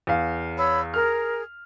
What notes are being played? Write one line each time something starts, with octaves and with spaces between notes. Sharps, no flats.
E2 F5
C#5 B5 E6
G#4 A#4 F6